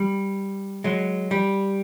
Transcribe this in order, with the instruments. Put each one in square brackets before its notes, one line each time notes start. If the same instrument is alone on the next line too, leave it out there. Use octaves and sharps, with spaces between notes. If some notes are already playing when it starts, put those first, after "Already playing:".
Already playing: [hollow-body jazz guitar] G3
F#3 G#3
G3